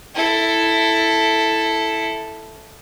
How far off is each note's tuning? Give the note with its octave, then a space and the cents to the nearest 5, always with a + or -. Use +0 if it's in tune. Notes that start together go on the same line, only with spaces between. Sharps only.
E4 +0 A4 +0